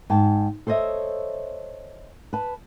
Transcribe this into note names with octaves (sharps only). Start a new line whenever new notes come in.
G#2 G5 A5
A4 C5 C#5 D#5 E5
B4 A5